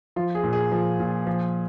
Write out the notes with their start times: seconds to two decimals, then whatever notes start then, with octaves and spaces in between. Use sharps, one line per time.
0.16 F3 F4
0.35 G#4
0.43 A#2
0.53 G#4
0.72 F3
1.00 A#2
1.27 F3